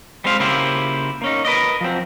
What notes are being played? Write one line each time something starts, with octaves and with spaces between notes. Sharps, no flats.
G3 G#3 C4 C5 F5
C#3 A#3 E4 F4 G4 C5
A#3 C#4 D#4
A#4 B4 D5 D#5
F3 F#3 C4